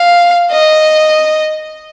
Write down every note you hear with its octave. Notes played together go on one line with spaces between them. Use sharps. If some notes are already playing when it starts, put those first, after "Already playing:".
Already playing: F5
D#5